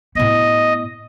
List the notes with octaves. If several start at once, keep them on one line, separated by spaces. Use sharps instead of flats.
A2 B3 D#5